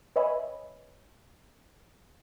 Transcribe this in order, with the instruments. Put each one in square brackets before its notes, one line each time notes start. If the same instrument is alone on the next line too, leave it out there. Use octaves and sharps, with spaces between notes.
[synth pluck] B4 C#5 D#5 E5 G#5 B5